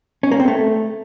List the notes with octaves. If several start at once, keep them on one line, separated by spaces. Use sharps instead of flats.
C#4
A#3
C4
A3